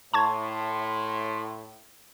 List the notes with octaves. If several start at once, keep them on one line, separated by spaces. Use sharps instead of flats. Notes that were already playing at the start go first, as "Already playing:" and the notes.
A2 A5 C6 C#6 G#6